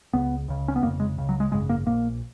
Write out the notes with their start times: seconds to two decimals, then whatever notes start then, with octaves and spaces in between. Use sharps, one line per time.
0.13 C#2 C#3 B3
0.48 C#2 C#3
0.68 C#4
0.76 B3
0.82 F1 F2 C#3 A#3
1.00 G#3
1.18 C#2 C#3
1.29 F#3
1.40 G#3
1.51 G#1 F#2 C#3 G#3
1.69 A#3
1.86 A#1 A#2 A#3